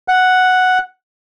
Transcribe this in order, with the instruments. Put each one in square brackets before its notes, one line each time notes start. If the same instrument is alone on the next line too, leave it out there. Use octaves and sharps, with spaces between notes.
[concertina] F#5